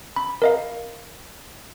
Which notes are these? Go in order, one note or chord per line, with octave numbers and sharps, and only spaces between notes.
B5
A#4 D#5 F5